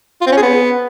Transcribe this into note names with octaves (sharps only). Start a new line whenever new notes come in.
F4
C4
C#4
G#4
B3